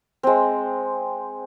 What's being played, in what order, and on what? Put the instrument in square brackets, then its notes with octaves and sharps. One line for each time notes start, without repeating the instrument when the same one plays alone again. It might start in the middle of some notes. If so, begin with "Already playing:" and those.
[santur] G#3 C4